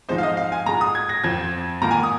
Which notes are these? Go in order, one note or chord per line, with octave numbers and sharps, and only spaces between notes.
G#2 F3 G#3 D#4 C5
F5
D#5
F5
G#5
G#2 G#3 F4 A#5
D#6
G#6
A#6
F2 F3 C4 G#6
G#2 D#3 A#3 F4 A#5
G#5
D#6